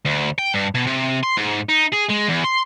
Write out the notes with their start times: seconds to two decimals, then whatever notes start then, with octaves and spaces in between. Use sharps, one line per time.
0.05 D2
0.38 G5
0.54 G2
0.75 B2
0.87 C3
1.23 C6
1.37 G#2
1.69 D#4
1.92 G#4
2.09 G#3
2.28 E2
2.44 C6